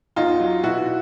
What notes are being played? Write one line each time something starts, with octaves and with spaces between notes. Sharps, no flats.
E2 D#4 F4
F#3
B2 E4 F#4